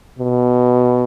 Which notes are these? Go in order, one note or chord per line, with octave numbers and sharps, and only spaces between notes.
B2